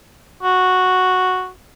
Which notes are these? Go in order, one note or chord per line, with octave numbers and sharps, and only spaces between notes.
F#4